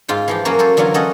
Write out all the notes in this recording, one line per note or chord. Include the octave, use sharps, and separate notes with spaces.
G#2 F4 G5
E3 F3 G4
F#3 A#3 C#4 F#4 C#5
A4 C5 C#5
D3 E3 F#3 F4 F#4 A#4
C#4 F#4 A4 C#5 D#5 F#5